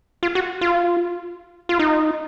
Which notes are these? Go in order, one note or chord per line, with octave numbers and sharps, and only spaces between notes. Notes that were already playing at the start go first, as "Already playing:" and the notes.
F4
F#4
F4
F4
D#4